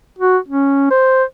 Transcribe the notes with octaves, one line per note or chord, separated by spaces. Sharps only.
F#4
C#4
C5